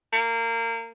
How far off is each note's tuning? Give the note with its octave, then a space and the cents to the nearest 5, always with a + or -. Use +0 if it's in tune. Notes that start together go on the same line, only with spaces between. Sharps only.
A#3 -25